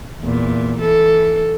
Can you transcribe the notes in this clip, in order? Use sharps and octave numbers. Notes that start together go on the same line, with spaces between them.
E2 A#2
E3 A4